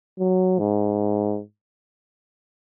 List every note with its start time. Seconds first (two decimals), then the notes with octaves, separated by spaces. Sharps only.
0.20 F#3
0.59 G#2